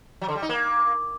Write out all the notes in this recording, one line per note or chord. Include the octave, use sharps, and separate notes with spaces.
F#3
D3
G3
D#4
A#3